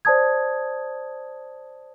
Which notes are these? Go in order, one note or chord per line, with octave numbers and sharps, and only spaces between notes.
C5 D5 A5 D#6 G#6